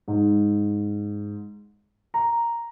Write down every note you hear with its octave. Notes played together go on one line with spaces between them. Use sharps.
G#2
A#5